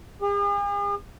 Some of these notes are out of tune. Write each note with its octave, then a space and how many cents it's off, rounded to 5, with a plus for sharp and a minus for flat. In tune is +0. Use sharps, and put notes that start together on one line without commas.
G#4 -45